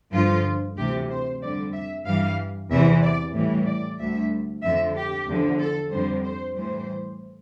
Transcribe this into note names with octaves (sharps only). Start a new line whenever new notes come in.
G2 D3 F3 F4
D2 C3 E3 G4
C5
F2 D3 G3 D5
E5
G2 E3 G3 F5
E2 C3 E3 E5
D5
A2 E3 G3
D5
D2 D3 G3 E5
F2 D3 F3 E5
G4
E2 D3 F3
A4
F2 D3 G3 C5
C5
A2 E3 G3 C5